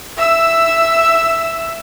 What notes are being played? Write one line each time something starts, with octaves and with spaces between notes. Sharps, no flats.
E5 E6